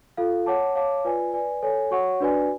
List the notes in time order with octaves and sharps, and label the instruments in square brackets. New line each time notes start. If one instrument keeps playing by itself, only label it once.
[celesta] F4 A4 F5
C#5 F#5 A5 D6
C#5 F5 A5 D6
F4 B4 D5 G#5
B4 D5 G#5
A4 C#5 G#5
F#4 C#5 F#5 C#6
D4 F#4 B4 D5 G#5